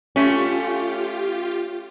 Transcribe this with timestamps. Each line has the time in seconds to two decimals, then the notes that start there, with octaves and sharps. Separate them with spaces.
0.16 A3 C#4 F4 G4